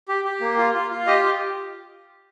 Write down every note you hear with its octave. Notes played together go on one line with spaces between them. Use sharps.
G4
G4
A#3
F4
F4
F4
G4 D#5